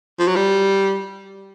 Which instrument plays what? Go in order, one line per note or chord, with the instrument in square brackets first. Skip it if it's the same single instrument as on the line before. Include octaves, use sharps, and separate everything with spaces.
[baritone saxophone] F3
F#3
G3